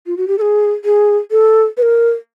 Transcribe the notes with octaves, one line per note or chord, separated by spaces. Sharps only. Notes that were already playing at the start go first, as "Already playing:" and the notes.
F4
F#4
G4
A4
G#4
G#4
A4
B4
A#4